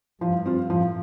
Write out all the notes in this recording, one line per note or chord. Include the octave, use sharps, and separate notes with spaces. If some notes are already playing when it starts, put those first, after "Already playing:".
G2 F3
C4 F4
A2 F3